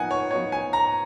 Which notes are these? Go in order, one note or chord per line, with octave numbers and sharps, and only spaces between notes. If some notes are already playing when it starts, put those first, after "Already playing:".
Already playing: F3 B3 D#4 F#5 G#5
C#5
F3 B3 D#4 C#5
G#5
A#5